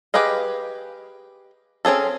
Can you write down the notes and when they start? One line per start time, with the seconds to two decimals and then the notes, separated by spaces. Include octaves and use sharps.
0.14 G4 G#4 B4 D#5 F5
1.85 C4 C#4 G#4 A4